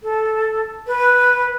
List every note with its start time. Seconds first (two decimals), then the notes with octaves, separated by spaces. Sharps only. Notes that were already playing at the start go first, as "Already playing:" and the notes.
0.02 A4
0.86 B4